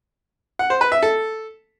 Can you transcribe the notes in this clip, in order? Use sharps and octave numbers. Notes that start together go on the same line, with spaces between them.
F#5
C5
B4
E5
A4